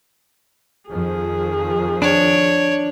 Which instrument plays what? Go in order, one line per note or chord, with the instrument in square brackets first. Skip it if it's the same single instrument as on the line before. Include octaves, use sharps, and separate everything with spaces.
[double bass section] F2 D#3 F3 [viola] G#4
[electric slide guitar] D4 [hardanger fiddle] C#5